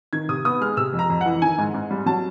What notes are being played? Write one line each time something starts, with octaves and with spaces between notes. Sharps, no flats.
D#3 G#6
C3 D#6
B3 D#6
G#3 F6
C3 E6
F2
A#5
F2
E3 F#5
D#3 G#5
G#2
G#2
G3
F#3 A5